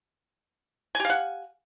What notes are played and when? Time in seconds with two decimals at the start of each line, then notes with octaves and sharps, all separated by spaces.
0.95 G#5
1.00 G4
1.05 F5
1.10 F#5